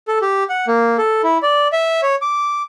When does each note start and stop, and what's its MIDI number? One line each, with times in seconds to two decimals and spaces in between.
0.08 0.19 69
0.22 0.44 67
0.50 0.65 78
0.67 0.97 58
0.98 1.22 69
1.23 1.38 64
1.42 1.68 74
1.73 2.01 76
2.03 2.15 73
2.22 2.62 86